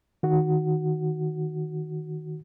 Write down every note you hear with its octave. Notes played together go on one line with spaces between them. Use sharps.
D#3 F#4